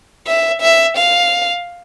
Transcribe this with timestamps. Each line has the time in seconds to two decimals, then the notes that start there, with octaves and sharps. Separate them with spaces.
0.27 E5
0.62 E5
0.97 F5